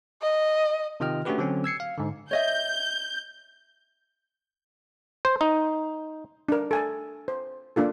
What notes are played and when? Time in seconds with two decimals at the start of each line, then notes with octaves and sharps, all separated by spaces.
0.22 D#5
1.00 C3 D#3 F4 D#5 G5 F6
1.25 A3 C#4 D4 F#4 G4 B4
1.38 D3 F#3 C4 C#4
1.64 E6 G#6 C7 C#7
1.80 F5
1.98 G#2 D3
2.31 C#5 D#5 E5 G6
5.25 C5
5.41 D#4
6.49 D4 A#4
6.71 A4 G#5 A5
7.28 C5
7.76 A#3 D4 F4 A4